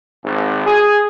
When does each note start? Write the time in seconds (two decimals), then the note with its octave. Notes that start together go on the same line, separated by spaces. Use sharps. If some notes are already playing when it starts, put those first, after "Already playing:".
0.24 G#1
0.66 G#4